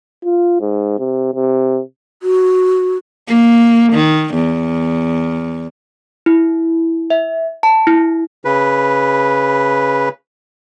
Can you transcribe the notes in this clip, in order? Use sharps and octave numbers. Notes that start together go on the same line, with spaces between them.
F4
G#2
C3
C3
F#4
A#3
D#3
E2
E4
E5
A5
E4
C#3 B4